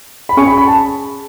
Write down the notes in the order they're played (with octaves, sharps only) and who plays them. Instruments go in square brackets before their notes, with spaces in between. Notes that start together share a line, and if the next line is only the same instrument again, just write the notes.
[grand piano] B5
[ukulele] C#4 G#4 C#5 G#5 [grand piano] C#6
[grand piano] B5
B5
A5